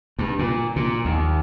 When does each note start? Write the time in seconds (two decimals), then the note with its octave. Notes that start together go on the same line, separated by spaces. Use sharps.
0.19 G2
0.39 A#2
0.76 A#2
1.05 D#2